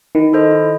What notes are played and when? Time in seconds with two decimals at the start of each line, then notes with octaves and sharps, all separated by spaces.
0.15 D#3 E4
0.33 A4 C5 D#5
0.51 E4